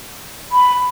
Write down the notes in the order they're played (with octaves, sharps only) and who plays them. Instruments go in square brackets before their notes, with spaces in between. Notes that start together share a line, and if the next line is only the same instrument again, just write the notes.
[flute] B5